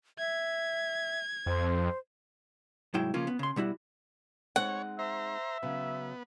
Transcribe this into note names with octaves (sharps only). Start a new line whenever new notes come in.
E5 G#6
F2 C5
C2 G#2 F#3 G#3 E4 G5
C#3 F3 A#3 C#4 F4
B3
C#3 C6
B2 G3 E4 F#4
G#3 C4 D#4 C#5 F#5
C5 E5 A#5
C#3 F#3 B3